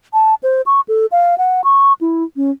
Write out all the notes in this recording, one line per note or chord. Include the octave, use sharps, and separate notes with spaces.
A5
C5
C#6
A4
F5
F#5
C#6
E4
C#4